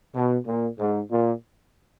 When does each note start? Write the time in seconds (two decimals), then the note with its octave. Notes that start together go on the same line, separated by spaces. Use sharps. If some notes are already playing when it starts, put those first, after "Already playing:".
0.14 B2
0.46 A#2
0.78 G#2
1.09 A#2